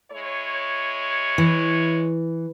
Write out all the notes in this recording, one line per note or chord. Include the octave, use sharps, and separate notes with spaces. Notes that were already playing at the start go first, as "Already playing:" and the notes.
G#3 E4 C#5
E3